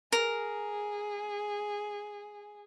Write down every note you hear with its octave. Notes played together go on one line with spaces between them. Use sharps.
G#4 A#4